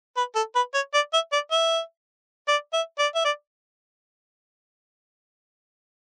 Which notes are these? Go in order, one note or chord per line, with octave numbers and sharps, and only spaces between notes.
B4
A4
B4
C#5
D5
E5
D5
E5
D5
E5
D5
E5
D5